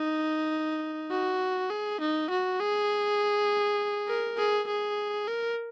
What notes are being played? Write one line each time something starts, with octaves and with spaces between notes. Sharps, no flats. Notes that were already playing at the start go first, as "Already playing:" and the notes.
Already playing: D#4
F#4
G#4
D#4
F#4
G#4
A#4
G#4
G#4
A#4